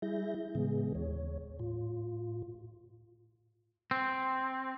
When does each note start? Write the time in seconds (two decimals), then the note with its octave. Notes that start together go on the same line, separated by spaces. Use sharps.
0.02 G3 E4 G#4 E5 G6 A#6
0.55 A2 C#3 E3 G#3 B3 G#4
0.95 D#2 C#5
1.59 A2 F4
3.91 C4